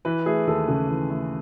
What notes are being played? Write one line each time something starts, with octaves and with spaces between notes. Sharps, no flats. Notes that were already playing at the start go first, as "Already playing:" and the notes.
E3 B4
A3 G#4
D#2 A4
C#3 A4
E3
A3